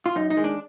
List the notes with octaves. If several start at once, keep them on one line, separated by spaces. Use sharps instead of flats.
F4
F#2 D#4
D#4
D#3 G#3
D4